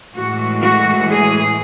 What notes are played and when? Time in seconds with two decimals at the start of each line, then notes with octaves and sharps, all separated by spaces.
0.16 A2 E3 G#3 F#4
0.62 F#4
1.09 G#4